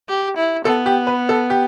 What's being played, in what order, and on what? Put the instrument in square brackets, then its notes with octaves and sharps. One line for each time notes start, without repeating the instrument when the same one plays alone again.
[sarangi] G4
E4
[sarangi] B3 [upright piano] A4
[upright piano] G4
B4
A4
G4